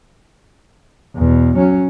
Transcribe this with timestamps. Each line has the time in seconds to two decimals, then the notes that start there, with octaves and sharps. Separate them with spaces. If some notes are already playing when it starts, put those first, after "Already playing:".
1.16 E2 B2
1.57 F#3 C#4